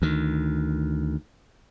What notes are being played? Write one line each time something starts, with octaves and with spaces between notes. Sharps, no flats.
D2 D#3